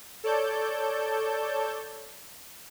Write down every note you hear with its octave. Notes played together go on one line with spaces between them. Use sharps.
A4 C#5 D5 A5 G6